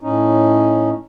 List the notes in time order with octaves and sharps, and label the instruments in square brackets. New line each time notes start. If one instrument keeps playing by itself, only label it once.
[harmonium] A2 C#4 D#4